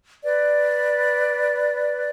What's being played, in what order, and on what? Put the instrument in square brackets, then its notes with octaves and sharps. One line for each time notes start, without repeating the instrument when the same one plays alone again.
[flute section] B4 D5